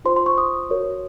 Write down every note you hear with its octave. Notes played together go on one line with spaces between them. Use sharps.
F4 C5 C6
C6
C#6
D#6
F#4 A#4 C#5